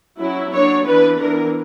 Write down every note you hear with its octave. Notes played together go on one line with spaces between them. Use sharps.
F#3 C#4 E4
F#3 A#3 D4 C#5
E3 B3 D4 B4
E3 B3 D4 A#4